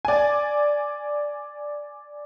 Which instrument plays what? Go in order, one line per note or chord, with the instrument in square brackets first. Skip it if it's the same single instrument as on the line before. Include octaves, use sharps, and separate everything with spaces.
[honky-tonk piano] D5 G#5